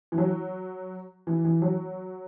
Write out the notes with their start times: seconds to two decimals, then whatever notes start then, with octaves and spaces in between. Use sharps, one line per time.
0.12 E3
0.18 F#3
1.27 E3
1.44 E3
1.62 F#3